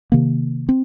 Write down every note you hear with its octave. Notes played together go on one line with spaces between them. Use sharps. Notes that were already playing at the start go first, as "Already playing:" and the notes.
C3 D#3 A#3
C4